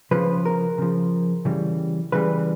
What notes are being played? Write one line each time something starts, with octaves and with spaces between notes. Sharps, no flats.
C#3 F3 B4
A#4
C#3 F3
C#3 E3 G3
C#3 E3 G3 B4